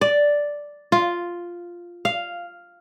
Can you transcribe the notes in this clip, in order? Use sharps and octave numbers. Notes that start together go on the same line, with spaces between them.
D5
F4
F5